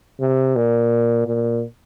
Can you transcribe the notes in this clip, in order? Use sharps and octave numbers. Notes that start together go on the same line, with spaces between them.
C3
A#2
A#2